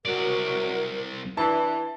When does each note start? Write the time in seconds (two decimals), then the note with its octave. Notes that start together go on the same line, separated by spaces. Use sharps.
0.05 C2 F#3 F#4 A#4 D5
1.37 E3 D4 A5